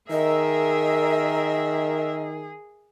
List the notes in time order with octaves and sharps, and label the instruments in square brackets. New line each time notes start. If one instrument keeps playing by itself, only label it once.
[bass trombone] D#3 [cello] G#4 [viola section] A#4 E5 [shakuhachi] D#5